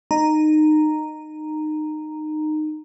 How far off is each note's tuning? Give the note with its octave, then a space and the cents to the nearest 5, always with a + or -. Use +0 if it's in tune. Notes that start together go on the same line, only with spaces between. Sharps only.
D#4 -20 A#5 -5